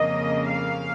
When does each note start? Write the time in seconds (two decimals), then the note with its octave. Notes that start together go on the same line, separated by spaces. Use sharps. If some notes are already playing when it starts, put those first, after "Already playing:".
Already playing: F2 C#3 A#3 D#5
0.48 F5